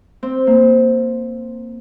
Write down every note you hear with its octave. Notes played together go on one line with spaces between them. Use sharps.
C4
A#3